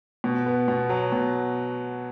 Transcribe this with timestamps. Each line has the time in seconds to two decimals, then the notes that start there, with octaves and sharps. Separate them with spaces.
0.24 B2
0.46 B3
0.68 B2
0.89 F#3
1.12 B2